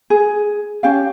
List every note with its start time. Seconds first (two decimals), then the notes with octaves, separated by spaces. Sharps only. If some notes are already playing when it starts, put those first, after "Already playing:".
0.10 G#4
0.83 C#4 G4 F5